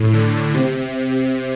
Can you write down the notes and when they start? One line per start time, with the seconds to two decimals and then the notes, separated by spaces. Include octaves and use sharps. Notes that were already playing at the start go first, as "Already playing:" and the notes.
Already playing: A2
0.14 D3
0.54 C3